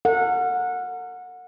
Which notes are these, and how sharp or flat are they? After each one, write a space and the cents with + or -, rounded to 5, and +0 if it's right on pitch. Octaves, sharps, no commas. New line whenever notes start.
A#4 -40 F#5 -25